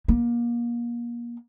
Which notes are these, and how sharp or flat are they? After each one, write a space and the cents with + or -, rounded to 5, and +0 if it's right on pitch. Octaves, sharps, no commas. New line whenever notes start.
A#3 +30